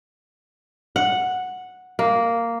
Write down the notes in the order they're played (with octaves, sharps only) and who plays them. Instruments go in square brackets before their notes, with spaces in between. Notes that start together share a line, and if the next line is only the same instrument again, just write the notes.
[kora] F#5
A#3